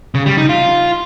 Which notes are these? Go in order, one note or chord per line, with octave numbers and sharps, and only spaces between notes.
C#3
G3
D#4
F4